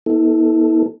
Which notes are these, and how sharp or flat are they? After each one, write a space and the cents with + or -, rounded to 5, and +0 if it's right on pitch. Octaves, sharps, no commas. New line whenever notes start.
B3 -35 E4 -40 A4 +0